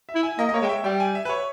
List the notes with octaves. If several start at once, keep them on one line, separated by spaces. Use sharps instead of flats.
E5
E4
G#5
A#3 D#5
D#5
A#3 C#5
G#3 G5
E5
G3 G5
G#5
E5
B4
C#5